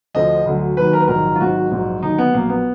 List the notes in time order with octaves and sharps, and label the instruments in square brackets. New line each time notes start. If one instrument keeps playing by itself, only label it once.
[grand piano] D2 D3 F3 D#5
D2 D3 F#3
D#2 D#3 F#3 B4
A#4
B4
A#1 G#2 D#3 F#3 A#4
F4
G#1 G#2 D#3 F#3 F#4
A#1 G#2 F#3
D#2 D3 F#3 D#4
B3
A#1 A#2 F#3 A#3
B3